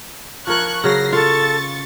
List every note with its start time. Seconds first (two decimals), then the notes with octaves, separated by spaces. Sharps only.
0.47 F3 A#4 C#6 F#6 G#6
0.84 C#3 F#3 A#6 C7
1.13 F4 A4 C#6 A6